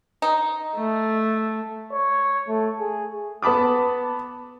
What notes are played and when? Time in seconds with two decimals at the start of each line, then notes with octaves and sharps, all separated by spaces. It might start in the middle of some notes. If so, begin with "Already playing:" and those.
0.22 D#4
0.76 A3
1.93 C#5
2.48 A3
2.80 G#4
3.42 B3 A5 B5 D6 D#6